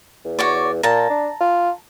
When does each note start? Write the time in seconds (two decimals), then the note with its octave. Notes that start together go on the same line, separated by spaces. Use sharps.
0.25 E2
0.39 F#4 C#5 D5
0.83 A#2 A5 A#5
1.10 D4
1.40 F4